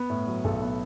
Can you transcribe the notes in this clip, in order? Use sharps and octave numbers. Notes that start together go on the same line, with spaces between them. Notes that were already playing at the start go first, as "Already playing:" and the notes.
Already playing: B3
A2
F#3
B1 A4
B3